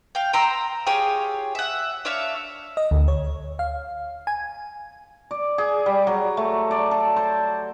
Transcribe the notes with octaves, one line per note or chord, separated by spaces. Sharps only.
F5 G5
G5 A#5 C6 E6
F4 G4 G#4 C#5
E5 F#5
D4 C#5 E5 F5
D#5
D2
C#5
F5
G#5
D5
G#4
G3
F#3
A3
D5
A4
C5